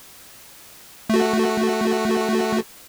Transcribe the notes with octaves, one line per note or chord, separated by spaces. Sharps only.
A3 F#4